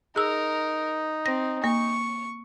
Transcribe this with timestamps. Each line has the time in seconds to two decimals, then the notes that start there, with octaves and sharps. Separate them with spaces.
0.16 D#4 G#4 A#4 E6
1.26 C4 A#6
1.64 A#3 C#6